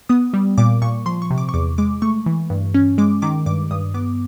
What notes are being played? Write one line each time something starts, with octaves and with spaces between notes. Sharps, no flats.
B3 D#6
G3
A#2 D6
A#2 C#6
F3 C6
C#6
C3
D6
C#6
E2 D6
G#3 D6
A3 C#6
E3
G2
C#4
G#3 D6
D#3 D6
G2 D6
G2 D#6
B3 D6